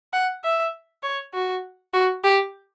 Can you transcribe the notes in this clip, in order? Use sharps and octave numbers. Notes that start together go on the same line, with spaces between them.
F#5
E5
C#5
F#4
F#4
G4